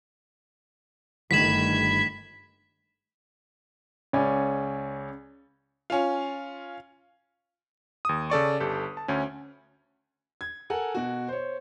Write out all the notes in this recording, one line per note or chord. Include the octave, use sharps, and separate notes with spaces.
G1 D#3 A3 B5 G#6 B6 E7
C#2 C#4 D5 G#5
C#4 F4
D#2 D#6
C#3 A4 D5 C#6
G1 G4 A4
A5
D2 C#4
G#6
A4 A#4 F#5 G#5
B2 F#4
C5 C#5